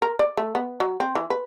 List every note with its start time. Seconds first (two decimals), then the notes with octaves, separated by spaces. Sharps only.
0.02 A#4
0.19 D5
0.37 A3
0.55 B3
0.80 F#3
1.00 C4
1.15 E3
1.30 B4